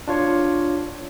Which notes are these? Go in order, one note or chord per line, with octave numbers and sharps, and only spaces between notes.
D4 F4 C#5